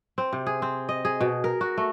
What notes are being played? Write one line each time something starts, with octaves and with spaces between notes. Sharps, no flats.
C4
C3
G#4
C4
D#5
G#4
B2
A#4
F#4
A3